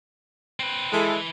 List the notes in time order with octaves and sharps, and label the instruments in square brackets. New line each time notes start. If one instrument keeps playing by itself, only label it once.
[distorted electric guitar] C4 B4
[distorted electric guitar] E3 [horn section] G#3 E4 A4